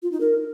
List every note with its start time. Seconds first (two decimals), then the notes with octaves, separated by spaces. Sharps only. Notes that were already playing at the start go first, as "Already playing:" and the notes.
0.03 F4
0.12 D#4
0.21 A#4